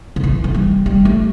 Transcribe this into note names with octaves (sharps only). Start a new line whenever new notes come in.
D3
E3
A3
G3
G3
A3